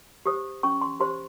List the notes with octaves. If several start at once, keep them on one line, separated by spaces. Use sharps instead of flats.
G4 C5 D#6
C#4 C#6
C6
G4 C5 C6